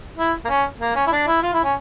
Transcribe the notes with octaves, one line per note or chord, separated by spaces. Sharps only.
E4
A#3
C#4
A#3
C#4
E4
D4
E4
F4
E4
C#4